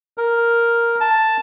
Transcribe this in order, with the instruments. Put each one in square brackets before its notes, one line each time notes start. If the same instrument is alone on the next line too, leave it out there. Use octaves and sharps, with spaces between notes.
[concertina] A#4
A5